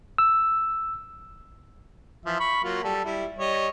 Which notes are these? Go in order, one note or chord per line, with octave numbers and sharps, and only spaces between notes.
E6
E3 F3 E5
B5 C#6
F#3 A#3 F4
G3 A4
G3 E4
G3 C#5 D#5